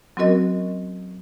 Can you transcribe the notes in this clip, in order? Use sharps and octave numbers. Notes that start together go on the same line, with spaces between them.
F#3 C4 C#4 F#4 A#4 D#5